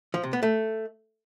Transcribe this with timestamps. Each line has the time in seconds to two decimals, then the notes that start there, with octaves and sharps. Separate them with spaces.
0.14 F3
0.23 C3
0.33 B3
0.43 A3